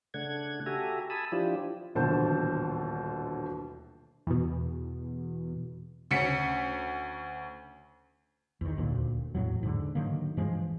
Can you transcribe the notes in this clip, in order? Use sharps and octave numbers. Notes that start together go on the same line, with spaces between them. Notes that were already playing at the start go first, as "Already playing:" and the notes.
C#3 A3 D4 F#5 G#6
F#4 G4 A4 E5 G#5 A#5
G#5 A5 B5 D#6 E6
F3 D4 E4 F4 G4
D#1 A1 B2 D3 C5 A5
E2 B2
D2 C#4 B6 C#7
E2 D#3
D#1 D2 A#2
E2 A2 F#3
G#2 D3
D3 D#3 F#3 A#3
G2 E3 F3 G#3